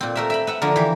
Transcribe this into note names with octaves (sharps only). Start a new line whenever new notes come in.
A#2 C4
A3 A#4 E5
E5 G5 B5
B4 E5 F#5
D3 F3 A#3 A#4
E3 G4